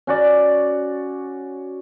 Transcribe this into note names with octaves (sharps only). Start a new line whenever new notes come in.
C#4 F#4 D5